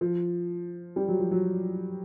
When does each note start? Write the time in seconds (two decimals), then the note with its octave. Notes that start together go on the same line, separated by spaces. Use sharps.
0.01 F3
0.96 G3
1.08 F#3
1.20 F3
1.31 F#3